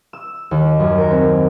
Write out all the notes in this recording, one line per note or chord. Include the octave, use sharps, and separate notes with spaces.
E6
D#2
F#2
A#4
C4